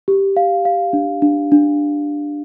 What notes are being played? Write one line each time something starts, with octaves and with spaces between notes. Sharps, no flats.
G4
F5
F5
D4
D4
D4